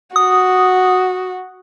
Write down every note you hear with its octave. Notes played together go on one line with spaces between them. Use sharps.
F#4 D#6